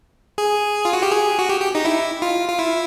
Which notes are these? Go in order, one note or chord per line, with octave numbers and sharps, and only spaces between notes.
G#4
F4
F#4
G4
G#4
F#4
G4
G4
D#4
E4
F4
F4
E4